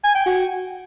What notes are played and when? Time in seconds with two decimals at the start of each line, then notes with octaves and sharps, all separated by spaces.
0.04 G#5
0.15 G5
0.26 F#4